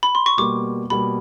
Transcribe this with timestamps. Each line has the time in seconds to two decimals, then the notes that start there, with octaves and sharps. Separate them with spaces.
0.03 B5
0.15 C6
0.26 C#6
0.37 B2 G3 A#3 D6
0.90 B2 G3 A#3 B5